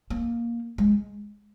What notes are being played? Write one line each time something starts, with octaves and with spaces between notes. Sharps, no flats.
A#3
G#3